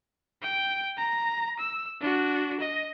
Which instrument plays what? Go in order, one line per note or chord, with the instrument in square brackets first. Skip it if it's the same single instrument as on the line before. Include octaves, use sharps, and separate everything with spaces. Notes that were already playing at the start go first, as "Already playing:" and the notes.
[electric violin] G5
A#5
E6
D4 F#4
D#5